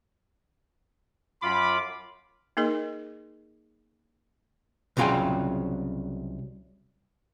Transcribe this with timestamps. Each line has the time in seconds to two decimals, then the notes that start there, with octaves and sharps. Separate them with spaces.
1.42 F#2 F4 B5 D6
2.57 A#3 D#4 G#4 A#4 D#5
4.97 C2 C#3 F#3 F4 G#4 G5